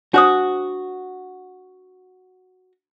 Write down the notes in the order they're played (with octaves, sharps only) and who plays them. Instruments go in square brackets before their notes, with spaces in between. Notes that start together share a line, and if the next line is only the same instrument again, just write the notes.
[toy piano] D4 C5 D#6 [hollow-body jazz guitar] F#4